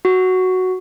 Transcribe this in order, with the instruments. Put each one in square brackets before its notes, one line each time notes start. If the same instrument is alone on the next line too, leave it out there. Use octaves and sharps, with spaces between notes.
[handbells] F#4